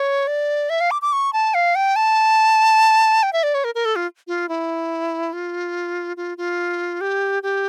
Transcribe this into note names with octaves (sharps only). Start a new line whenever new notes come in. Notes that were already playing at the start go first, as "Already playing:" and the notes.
Already playing: C#5
D5
E5
F5
D6
D6
C#6
A5
F5
G5
A5
G5
E5
D5
C#5
A#4
A#4
A4
F4
F4
E4
F4
F4
F4
G4
G4